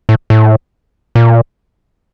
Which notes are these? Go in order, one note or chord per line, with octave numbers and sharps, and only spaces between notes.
A2
A2
A#2